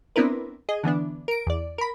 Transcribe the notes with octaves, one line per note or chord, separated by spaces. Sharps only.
B3 C4 D4 E4 A#4 B4
G#4 D#5
D3 E3 B3 D4
A#4 D7
E2 D5
A#4 B5